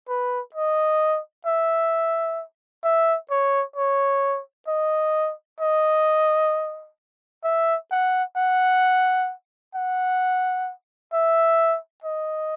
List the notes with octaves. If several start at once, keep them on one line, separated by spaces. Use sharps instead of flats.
B4
D#5
E5
E5
C#5
C#5
D#5
D#5
E5
F#5
F#5
F#5
E5
D#5